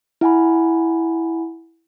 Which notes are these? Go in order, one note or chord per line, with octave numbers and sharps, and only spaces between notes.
E4 F#5 G#5 B5